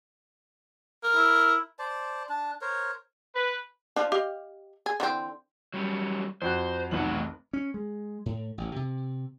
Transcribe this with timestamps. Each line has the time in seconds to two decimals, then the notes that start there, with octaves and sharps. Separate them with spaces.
1.03 A#4
1.16 E4
1.79 C5 D5 A5
2.29 D4 A5
2.61 A#4 C5 C#5
3.35 B4
3.96 F3 D4
4.12 G4 D#5 F5
4.86 G#4
5.00 D3 E3 C4
5.74 F#3 G3 C#4
6.42 F2 F#4 C5 F#6
6.91 F1 B1 E3 A3 F#5 F#7
7.53 C#4
7.74 G#3
8.26 A2
8.58 A1
8.76 C3